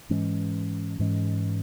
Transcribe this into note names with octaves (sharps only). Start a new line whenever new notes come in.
G#2 E3 G#3 C#4
G#2 E3 G#3 C#4